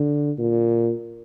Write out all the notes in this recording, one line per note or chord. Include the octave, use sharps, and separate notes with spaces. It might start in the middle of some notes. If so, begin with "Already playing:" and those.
Already playing: D3
A#2